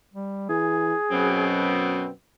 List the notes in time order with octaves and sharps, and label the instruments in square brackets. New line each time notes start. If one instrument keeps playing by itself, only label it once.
[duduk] G3
[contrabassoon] E3 [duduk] G#4
[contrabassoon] F#2 [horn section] B2 B3 C4